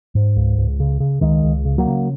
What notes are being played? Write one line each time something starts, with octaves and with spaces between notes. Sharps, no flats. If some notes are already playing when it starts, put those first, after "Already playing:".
G#2
C#2
C#2
C#3
C#3
C#2 D#3 G#3
C#2
C#3
F#3 A#3
C#3